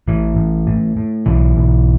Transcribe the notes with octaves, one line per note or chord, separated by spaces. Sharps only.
A1 E3
A1
A2
A2
B1 E3
B1